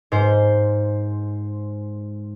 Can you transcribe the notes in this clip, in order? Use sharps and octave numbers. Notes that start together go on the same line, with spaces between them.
G#2 C5